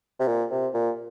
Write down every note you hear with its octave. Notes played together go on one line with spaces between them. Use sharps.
C3
A#2
C3
A#2